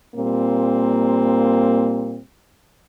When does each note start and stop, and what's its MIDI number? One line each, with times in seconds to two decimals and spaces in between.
0.16 2.19 46
0.16 2.19 55
0.16 2.19 58
0.16 2.19 60